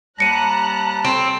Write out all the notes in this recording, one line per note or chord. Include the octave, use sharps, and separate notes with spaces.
D#2 G3 A5 A#5 F#6 A#6 C#7 D#7
C4 A4 C#5 D7